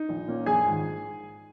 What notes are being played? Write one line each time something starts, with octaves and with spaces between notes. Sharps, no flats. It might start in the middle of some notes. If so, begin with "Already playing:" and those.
Already playing: D#4
A#1
A#2 A#3 C#4
A#1 G#4 G#5
G#2 D#3